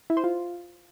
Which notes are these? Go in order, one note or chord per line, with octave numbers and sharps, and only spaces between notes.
E4
C5
F4